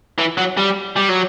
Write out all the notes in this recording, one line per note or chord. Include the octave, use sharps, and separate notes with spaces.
E3
F#3
G3
G3
F#3